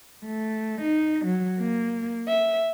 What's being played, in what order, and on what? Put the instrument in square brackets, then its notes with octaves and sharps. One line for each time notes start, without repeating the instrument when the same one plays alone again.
[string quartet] A3
D#4
F#3
A#3
E5